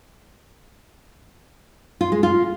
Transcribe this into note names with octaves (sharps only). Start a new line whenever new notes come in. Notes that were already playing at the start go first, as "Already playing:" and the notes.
F4
G#3
F4